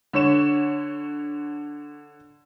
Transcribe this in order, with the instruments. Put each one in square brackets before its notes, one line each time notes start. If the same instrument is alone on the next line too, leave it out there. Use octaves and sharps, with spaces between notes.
[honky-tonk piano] D3 C#5 E7